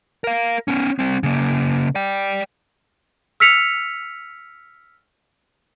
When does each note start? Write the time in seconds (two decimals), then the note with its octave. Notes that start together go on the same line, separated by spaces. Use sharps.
0.24 A#4 F5
0.68 B3 C#4
0.99 G3 C4
1.23 C#3 A#3
1.95 D5 G5
3.40 E6 F6 B6 C#7 F7